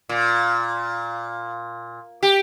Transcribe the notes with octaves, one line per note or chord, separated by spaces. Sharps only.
A#2
G4